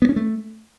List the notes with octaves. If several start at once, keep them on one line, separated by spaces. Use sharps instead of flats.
B3
C#4
A3